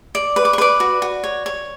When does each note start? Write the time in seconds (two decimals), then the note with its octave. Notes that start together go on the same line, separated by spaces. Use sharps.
0.15 D5
0.36 B4
0.45 D6
0.53 C#6
0.58 B4 D5 D6
0.80 F#4
1.02 F#4
1.24 C#5
1.46 C#5